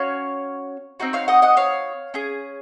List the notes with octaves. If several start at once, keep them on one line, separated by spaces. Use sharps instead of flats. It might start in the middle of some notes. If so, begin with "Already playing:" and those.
Already playing: C#4 F#4 C#5 F5
C4 D#4 F#4
C#5 F5
D#5 F#5
D#5 F#5
C#5 F5
C#4 G#4